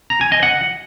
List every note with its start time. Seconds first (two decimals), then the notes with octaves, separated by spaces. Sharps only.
0.10 A#5
0.21 G#5
0.32 D#5
0.43 F#5